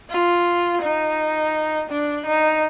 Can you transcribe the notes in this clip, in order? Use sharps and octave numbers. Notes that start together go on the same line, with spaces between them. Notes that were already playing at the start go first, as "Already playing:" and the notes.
F4
D#4
D4
D#4